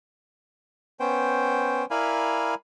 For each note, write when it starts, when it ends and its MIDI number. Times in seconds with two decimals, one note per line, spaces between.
1.00 1.86 59
1.00 1.86 61
1.00 1.86 72
1.00 1.86 79
1.91 2.55 64
1.91 2.55 70
1.91 2.55 74
1.91 2.55 77
1.91 2.55 80
1.91 2.55 83